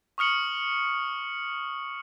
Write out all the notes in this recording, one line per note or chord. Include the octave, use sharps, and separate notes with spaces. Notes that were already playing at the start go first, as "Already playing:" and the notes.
C#6 D#6 F6 C#7 F#7